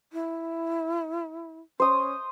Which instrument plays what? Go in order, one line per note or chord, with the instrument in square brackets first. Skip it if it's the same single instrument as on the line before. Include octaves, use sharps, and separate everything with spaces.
[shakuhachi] E4
[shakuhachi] C#4 [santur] C5 D#6